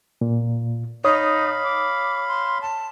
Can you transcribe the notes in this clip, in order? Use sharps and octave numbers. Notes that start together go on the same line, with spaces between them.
A#2
D#4 C#5 F5 B5 D#6
D6
C6
A5